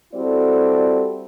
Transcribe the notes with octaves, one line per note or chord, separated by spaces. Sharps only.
G3 C4 E4 F#4 A4 D5